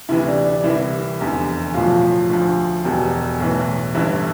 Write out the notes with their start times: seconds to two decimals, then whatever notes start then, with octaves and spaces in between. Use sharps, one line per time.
0.09 D2 C3 E3 E4
0.27 D4
0.45 D4
0.64 C2 C3 E3 E4
1.19 F1 E2 D3
1.74 B1 A2 F3 F4
2.30 D2 D3 F3
2.84 E1 E2 B2 G4
3.40 B1 A2 E3
3.95 G1 G2 E3 E4